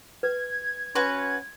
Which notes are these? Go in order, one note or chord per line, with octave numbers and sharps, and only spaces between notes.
B4 G#6
C#4 F#4 B4 C6